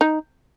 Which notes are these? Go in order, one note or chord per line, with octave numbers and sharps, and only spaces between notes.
D#4